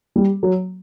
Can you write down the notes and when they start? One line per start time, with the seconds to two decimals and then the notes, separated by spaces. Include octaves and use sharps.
0.16 G3
0.43 F#3